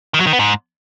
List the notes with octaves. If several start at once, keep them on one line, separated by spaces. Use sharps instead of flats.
D#3
F#3
D#3
B3
G#2